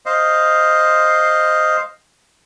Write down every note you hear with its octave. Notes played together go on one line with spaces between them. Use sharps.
C5 D#5 F5